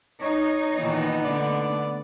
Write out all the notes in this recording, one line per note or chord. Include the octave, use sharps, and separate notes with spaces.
D#4 C#5
A#2 D#3 E3 B3
D3 A3 D5